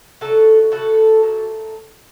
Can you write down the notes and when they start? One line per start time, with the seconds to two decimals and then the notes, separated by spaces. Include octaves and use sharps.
0.21 D3 F#3 A3 F#4 A4
0.72 A2 A3 F#4 A4
1.23 A#2 A3